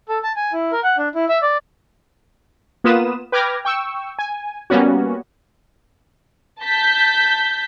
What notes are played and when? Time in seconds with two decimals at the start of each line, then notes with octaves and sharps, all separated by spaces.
0.09 A4
0.23 A5
0.36 G#5
0.53 E4
0.72 A#4
0.83 F#5
0.98 D4
1.15 E4
1.29 E5
1.42 D5
2.84 A#3 B3 F4 B4 D#6 E7
3.32 B4 G5 D6 F6 G#6 A#6
3.65 G5 C#6 E6
4.19 G#5
4.70 G3 A#3 B3 C#4 F#4
6.62 A5 G6 B6